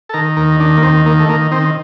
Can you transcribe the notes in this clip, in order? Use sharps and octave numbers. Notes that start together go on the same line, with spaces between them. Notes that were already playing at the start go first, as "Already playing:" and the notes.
A4
D#3 A#4
D#2 A#4
D#3 D4
A#3
D#2 C4
D#3 A#3
A3
D#3 A#3
D#3 C4